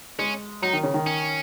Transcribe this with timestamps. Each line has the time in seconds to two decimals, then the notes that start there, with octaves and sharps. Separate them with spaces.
0.19 G#3 C#4
0.62 F#3 D#4
0.73 D#3
0.84 C#3
0.94 D#3
1.06 C#4